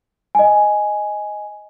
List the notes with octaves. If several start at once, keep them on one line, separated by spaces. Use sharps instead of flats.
D#5 G#5